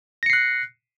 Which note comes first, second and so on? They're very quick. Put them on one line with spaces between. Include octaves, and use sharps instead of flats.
A#6 C#7 C7 F#6